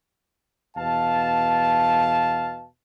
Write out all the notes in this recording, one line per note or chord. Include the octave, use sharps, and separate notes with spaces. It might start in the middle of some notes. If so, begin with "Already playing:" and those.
E2 B2 F5 A5